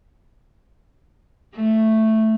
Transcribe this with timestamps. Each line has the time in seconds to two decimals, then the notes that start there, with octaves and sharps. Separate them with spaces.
1.56 A3